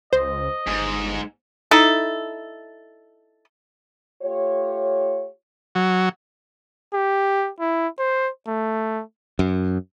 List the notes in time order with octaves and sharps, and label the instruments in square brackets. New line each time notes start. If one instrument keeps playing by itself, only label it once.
[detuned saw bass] C#2 [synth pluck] C5 [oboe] D#5
[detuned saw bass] G1 [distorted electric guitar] G#2
[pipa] D#4 E4 A4
[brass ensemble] A3 F4 G4 C#5
[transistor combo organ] F#3
[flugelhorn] G4
E4
C5
A3
[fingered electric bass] F#2